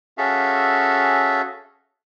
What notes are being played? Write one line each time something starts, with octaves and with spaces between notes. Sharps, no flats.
C#4 F#4 G#4 A4 E5 F5